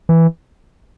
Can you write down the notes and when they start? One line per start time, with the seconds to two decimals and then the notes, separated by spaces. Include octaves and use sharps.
0.09 E3